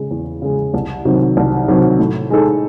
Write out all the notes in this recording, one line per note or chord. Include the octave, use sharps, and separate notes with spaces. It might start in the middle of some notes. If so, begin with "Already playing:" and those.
Already playing: C#3 G#3
E2
C#3 G#3
C2
C3 D#3 F#3
C2
C3 D#3 F#3
A2
G#3 D#4 A4